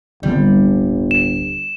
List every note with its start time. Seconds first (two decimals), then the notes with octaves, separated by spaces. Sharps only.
0.23 D1 G1 D3 G3 C4
1.11 E7